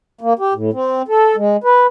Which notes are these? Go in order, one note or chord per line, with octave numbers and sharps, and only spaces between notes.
A#3
G4
A2
C4
A4
G#3
B4